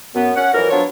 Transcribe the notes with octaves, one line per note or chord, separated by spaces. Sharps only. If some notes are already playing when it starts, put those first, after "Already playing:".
F#2 B3
C#4 F#5
F2 E3 F#3 A#4
F3 F#3 B3 D4 F4 C#5